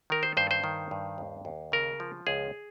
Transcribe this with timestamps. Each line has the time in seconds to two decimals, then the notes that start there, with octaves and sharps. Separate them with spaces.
0.10 D#3 A#4
0.23 C5
0.37 G2 C5
0.51 C5
0.64 D#3
0.91 G2
1.18 D#2
1.45 D#2
1.72 C#3 A#4
2.00 F3
2.27 C#2 G#4